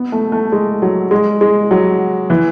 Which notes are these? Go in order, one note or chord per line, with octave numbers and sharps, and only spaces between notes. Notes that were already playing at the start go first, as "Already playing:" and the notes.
Already playing: B3
A3
A3
G#3
F#3
G#3
G#3
F#3
E3